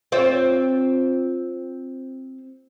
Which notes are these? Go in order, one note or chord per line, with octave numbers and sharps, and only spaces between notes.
C4 F4 C#5